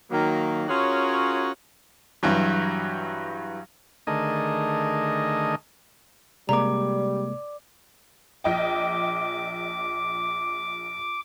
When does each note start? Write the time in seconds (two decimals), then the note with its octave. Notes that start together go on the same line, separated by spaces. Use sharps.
0.11 D#3 F#3 A#3
0.69 C#4 F4 F#4 G#4 A#4 C#5
2.23 G2 E3 F#3 G3
4.07 D3 D#3 A3 G#4 A#4 D#5
6.49 C3 G3 G#3 A#3 D5 A#5 D6
8.44 A#1 D#5 G5 D6